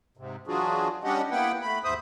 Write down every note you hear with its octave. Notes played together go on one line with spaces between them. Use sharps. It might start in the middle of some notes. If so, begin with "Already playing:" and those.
G#2 C3
E3 F#3 D4 F4 F#4 G#4
G3 C#4 D4 G4 D#5 F#5
A#3 B3 E4 B4 F#5 G5
A3 B5
D#2 G#2 C5 E5 D#6